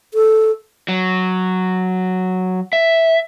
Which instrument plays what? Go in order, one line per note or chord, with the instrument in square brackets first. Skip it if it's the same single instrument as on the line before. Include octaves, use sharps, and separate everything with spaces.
[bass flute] A4
[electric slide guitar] F#3
E5